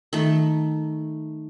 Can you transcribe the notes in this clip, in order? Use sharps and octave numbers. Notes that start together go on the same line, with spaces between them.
D#3 A3